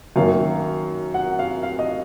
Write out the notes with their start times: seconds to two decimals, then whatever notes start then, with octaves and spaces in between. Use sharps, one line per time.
0.16 F#2 D#3 F#3 A#3 F5
1.14 F#5
1.39 F5
1.63 F5
1.79 D#5